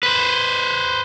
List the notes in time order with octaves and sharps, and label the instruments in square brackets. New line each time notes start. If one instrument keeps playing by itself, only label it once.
[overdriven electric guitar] B4 C5